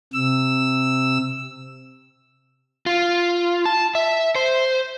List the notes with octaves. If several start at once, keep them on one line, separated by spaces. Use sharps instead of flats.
C3 E6
F4
A5
E5
C5